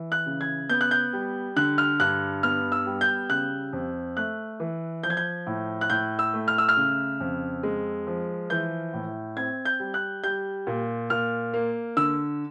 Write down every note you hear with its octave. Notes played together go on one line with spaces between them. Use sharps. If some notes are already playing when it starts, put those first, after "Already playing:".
Already playing: E3
F#6
C#3
G#6
B3 G6
F#6
G6
G3
D3 F#6
F6
G2 F#6
B3 F6
E6
G3
G6
C#3 F#6
F2
A3 F#6
E3
F3 G6
G#6
G6
A2
F#6
A2 G6
E6
A3
F6
E6
F6
C#3
F2
G#3
F3
E3 G6
A2
C4 G#6
G6
G3
F#6
G3 G6
A#2
A#2 F6
A#3
D3 E6